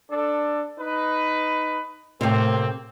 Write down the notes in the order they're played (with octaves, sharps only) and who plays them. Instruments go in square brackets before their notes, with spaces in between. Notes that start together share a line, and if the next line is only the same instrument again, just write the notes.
[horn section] D4 A4
D#4 B4
[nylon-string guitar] A2 C3 [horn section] A#3 C4